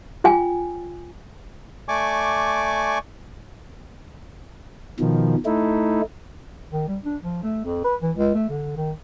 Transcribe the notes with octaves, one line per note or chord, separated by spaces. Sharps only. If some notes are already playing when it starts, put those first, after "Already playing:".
F4 G5 G#5
A3 D5 G#5 C#6 D6
B2 D#3 F3
A3 D#4 E4
D#3
G3
D4
F3
A3
F2
B4
E3
C#2
A3
D3
D#3